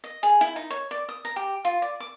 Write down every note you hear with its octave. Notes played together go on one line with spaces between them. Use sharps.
D#5
G#4
E4
D#4
C#5
D5
D#6
A#5
G4
F4
D5
D6